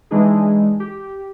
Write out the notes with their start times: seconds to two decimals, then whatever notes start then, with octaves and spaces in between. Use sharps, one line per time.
0.11 E3 G#3 D4 D#4 G#4
0.80 G4